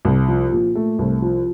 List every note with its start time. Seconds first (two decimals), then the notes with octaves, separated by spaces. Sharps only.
0.05 C2
0.28 F3
0.52 A#2
0.75 A3
0.99 C2
1.22 F3